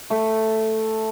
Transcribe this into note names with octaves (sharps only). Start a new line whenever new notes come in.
A3